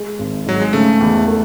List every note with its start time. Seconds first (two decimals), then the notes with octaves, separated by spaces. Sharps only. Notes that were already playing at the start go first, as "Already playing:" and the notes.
Already playing: G#3
0.19 G#1
0.46 G#2 F#3
0.61 G#3
0.73 C#3 A3
1.01 E2
1.28 A3